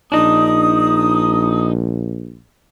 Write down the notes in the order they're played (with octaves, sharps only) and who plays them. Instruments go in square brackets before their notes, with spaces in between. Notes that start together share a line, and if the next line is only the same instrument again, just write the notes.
[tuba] A#1 [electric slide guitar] D4 D#4 [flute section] D#6